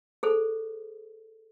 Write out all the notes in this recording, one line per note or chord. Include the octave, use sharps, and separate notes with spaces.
G#4 A4 C5